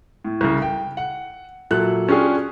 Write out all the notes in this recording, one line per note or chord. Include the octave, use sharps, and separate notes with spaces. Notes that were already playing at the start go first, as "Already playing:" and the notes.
A2
C2 C#3
G5
F#5
A#2 F#3 A4 E5 F#6
C#4 D4 F4 G4 G#4